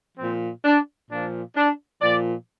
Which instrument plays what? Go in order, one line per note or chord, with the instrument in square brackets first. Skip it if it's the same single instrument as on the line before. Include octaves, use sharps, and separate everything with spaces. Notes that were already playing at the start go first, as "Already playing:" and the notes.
[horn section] A#2 F3 C4
D4
A#2 F3 D4
D4
A#2 F3 D5